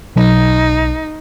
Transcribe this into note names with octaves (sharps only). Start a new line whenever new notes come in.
B1 D#4